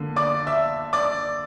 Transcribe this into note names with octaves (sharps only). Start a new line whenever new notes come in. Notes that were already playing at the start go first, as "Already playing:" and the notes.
Already playing: D3 A#3
D5 D6
E5 E6
D5 D6